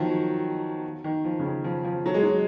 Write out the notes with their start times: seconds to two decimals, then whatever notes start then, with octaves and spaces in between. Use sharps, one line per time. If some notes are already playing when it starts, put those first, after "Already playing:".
Already playing: D#3 F3 F#3
1.04 D#3
1.24 F3
1.39 C#3
1.45 D#3
1.64 F3
1.85 F3
2.06 F#3
2.14 G#3
2.23 F#3